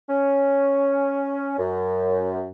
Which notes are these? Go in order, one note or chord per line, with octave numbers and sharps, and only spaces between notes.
C#4
F#2